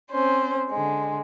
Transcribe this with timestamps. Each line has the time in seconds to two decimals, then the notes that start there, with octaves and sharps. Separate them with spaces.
0.11 C4 C#4 C5
0.69 D3 G#3